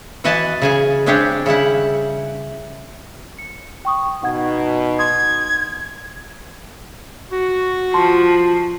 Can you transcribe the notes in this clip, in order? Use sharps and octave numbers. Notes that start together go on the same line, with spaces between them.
E3 F#4 B4 D#5 G#5 A5
C#3 G#4 G#5
G#3 C4 D4 G4 G#4 C#5
C#3 G3 E4 F#5
C#7
G5 C#6 D#6
B2 D#4 F#5 G#6
C6 D#6 G#6
F#4
F3 A5 C6